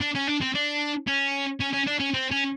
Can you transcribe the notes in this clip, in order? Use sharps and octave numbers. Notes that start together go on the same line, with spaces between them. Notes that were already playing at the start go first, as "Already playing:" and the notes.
D4
C#4
D4
C4
D4
C#4
C#4
C#4
D4
C#4
C4
C#4